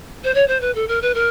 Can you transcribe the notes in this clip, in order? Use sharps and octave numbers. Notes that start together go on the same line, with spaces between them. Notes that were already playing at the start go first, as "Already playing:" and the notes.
C5
C#5
C5
B4
A4
A#4
B4
A#4